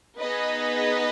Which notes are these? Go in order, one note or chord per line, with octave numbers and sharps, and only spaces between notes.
B3 D#4 G#4 B4 D#5